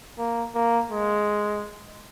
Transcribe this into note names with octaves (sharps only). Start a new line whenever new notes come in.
A#3
A#3
G#3